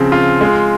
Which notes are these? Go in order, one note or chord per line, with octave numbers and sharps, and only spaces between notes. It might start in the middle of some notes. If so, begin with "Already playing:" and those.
Already playing: C#3 F3 C4
F4
G#3